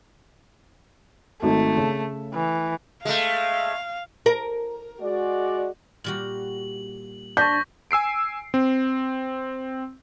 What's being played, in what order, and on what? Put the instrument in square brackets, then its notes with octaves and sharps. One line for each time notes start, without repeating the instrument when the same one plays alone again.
[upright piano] G#1 D#4 [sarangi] A3
[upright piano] C#3
[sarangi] E3
[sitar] G#3 A3 [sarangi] F5
[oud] A#4
[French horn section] G#3 F#4 D5
[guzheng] A#2 G3 F#4 [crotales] F#7
[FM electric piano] D4 A5 [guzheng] C5 [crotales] C#6 A#6 B6 [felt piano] G6
[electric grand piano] G#5 E6 C7 D7
C4